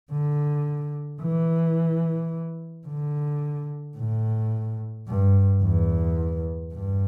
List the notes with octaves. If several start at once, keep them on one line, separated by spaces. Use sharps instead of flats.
D3
E3
D3
A2
G2
E2
G2